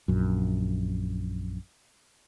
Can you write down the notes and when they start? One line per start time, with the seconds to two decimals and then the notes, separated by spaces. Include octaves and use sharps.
0.08 A#1 F#2